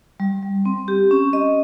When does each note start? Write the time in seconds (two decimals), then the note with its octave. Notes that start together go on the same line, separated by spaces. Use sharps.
0.20 G3
0.42 G3
0.65 C4
0.88 G4
1.11 C#4
1.33 D#5